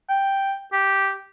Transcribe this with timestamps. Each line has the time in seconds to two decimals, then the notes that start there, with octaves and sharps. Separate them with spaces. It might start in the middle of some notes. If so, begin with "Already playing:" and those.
0.09 G5
0.73 G4